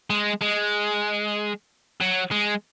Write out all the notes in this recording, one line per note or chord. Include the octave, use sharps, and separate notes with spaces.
G#3
G#3
F#3
G#3